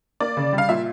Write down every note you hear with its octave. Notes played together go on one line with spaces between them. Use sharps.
A#3 D5
C#3
G3
F5
A#2 E5